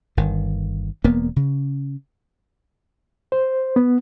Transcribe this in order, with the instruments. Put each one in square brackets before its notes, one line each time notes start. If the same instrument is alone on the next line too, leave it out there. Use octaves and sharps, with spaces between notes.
[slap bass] G1 D#3
E1 A#3 B3
C#3
[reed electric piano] C5
B3